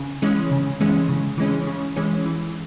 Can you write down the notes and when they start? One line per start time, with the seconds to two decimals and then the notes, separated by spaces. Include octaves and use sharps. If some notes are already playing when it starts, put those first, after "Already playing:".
Already playing: C#3
0.22 E3 G#3 C#4
0.51 C#3
0.80 E3 G#3 C#4
1.09 C#3
1.38 E3 G#3 C#4
1.67 C#3
1.96 E3 G#3 C#4
2.26 E3